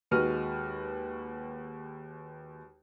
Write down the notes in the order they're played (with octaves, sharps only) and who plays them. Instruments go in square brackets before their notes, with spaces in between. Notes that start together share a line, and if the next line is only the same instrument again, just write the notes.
[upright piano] D#2 G#3 F#4 B4 F6 D#7